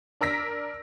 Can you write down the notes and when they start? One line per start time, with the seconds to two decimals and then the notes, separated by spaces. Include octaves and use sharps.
0.21 D4 A#4 E6 A#6 B6